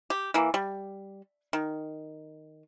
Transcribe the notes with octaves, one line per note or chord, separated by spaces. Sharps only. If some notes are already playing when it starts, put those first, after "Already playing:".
G4
E3 A#3
G3
D#3